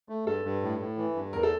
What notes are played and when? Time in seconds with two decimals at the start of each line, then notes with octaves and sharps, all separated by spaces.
0.09 A3
0.26 G2 A4
0.45 G2
0.62 A2
0.80 A2
0.98 E3
1.15 G2
1.32 E2 A#4
1.43 A4